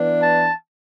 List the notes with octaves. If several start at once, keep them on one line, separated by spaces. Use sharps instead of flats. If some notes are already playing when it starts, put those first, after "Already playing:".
Already playing: E3 B3 D4
A5